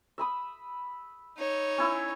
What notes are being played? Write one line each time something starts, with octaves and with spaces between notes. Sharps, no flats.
E5 B5 D#6
D#4 C#5
C#4 E4 E6